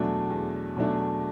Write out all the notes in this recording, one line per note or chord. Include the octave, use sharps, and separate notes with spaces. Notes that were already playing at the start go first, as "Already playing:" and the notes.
Already playing: E2 B2 F#3 A3 D4
E2
B2 F#3 A3 D4